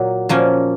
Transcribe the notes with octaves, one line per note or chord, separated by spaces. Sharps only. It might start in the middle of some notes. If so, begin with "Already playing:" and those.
Already playing: A#2 F#3 A#3
A#2 F3 A#3 C#4